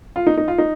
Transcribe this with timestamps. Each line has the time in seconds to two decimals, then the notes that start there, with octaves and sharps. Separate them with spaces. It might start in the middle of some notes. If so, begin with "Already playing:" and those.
0.16 F4
0.27 D#4
0.37 D#4
0.48 F4
0.58 D#4